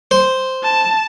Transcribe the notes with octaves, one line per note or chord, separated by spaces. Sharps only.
C5
A5